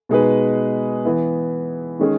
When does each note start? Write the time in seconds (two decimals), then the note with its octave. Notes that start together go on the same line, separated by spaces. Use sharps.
0.09 B2 G#3 D#4 G#4 B4
1.05 E3 B3 E4
1.99 D#3 G#3 C#4 G#4